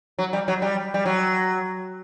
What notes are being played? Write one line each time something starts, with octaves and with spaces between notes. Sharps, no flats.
F#3
G3
F#3
G3
G3
F#3